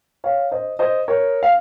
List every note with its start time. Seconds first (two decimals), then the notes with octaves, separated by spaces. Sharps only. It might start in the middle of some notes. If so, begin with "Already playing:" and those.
0.24 C#5 F5
0.52 C5 D#5
0.79 C5 D#5
1.08 A#4 C#5
1.43 F5